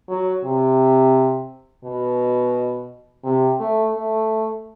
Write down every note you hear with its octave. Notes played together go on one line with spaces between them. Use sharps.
F#3
C3
B2
C3
A3
A3